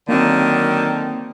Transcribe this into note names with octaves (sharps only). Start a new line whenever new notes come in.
D3 D#3 F#3 A#3 C4